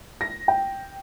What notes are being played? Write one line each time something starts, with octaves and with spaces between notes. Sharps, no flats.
A#6
G5